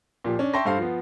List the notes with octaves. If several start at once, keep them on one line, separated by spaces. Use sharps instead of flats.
A#2 F3 G4
C#4 D4
E5 G5 A5 C6 C#6 A#6
G2 A4 C5 F5 C7
F3 B3